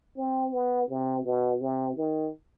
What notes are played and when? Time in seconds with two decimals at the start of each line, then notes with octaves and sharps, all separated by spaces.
0.17 C4
0.53 B3
0.89 C3
1.25 B2
1.61 C3
1.97 D#3